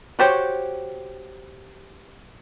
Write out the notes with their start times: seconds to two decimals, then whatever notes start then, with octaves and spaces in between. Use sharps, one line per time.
0.19 F#4 G4 C5 C#5